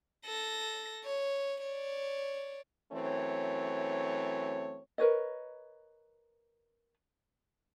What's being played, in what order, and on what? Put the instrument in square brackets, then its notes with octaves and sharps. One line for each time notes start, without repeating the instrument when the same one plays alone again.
[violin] A4 A#6
C#5
C#5 D5
[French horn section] F#2 E3 A3 C4 C#5
[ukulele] A#4 B4 C#5 D#5